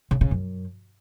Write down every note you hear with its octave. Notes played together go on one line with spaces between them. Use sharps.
C#3
C#3
F#2